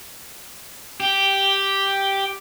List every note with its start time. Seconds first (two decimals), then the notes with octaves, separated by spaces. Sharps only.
1.00 G4